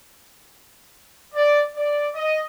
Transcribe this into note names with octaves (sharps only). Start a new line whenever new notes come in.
D5
D5
D#5